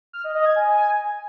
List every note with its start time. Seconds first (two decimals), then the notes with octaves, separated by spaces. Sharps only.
0.13 F6
0.24 D#5
0.35 D#5
0.45 G#6
0.56 G#5